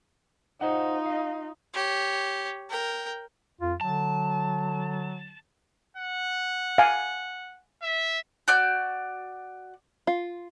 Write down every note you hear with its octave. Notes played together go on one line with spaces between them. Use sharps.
D#4 F4 C5 D#5 F#5
D#5 F5
G4 C#5
A#4 G5
F2 F4
D3 F#3 A5
F#5
F5 G#5
E5
F#4 D5 G6
F4